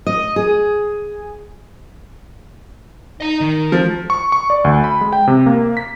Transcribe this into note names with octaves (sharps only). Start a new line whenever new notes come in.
D#5
G#4
D#4 D#5 A#5
D#3
F3
C#6
C#6
D5
D2
B5
G#3
G5
C3
A#3
B6